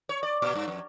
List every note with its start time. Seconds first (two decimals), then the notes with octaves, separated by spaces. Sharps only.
0.09 C#5
0.23 D5
0.42 A#2
0.56 G2
0.68 F2